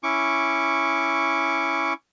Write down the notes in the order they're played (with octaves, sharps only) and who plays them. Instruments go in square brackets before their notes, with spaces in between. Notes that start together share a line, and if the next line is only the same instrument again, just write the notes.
[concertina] C#4 E4 C#6 D6